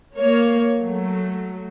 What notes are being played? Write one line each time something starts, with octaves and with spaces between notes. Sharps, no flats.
A#3 C#5
F#3 A3